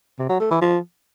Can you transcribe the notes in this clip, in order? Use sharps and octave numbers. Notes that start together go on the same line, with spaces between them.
C3
F#3
A3
E3
F3